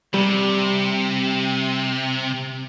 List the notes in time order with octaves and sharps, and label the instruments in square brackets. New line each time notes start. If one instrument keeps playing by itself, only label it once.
[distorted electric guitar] C3 [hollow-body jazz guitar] G3